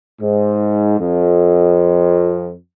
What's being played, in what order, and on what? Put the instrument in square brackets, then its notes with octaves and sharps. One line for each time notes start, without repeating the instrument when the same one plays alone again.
[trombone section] G#2
F2